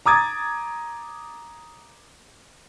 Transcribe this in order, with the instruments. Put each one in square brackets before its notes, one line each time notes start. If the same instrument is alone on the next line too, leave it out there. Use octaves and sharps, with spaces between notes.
[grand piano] A#5 D6 D#6 G#6 A6